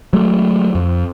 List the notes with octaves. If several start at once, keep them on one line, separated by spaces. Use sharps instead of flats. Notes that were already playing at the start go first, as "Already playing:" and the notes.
F#3 G#3 A3
F2